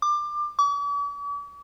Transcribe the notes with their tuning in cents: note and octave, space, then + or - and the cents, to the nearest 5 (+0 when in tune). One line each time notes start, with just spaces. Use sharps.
D6 +25
D6 -45